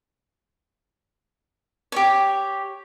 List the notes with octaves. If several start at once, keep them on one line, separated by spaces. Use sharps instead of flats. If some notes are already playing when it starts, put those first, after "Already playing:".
G4 C#5